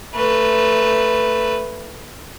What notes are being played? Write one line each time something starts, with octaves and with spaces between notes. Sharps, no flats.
A3 B4